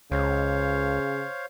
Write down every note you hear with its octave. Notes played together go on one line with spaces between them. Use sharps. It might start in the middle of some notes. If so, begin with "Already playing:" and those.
C#2 C#3 C5 C#5 F5